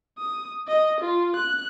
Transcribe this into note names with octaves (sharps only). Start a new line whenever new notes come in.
D#6
D#5
F4
F#6